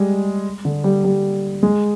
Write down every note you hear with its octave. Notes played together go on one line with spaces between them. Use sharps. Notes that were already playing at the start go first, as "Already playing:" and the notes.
Already playing: G3 G#3
D3
G3
G3
G#3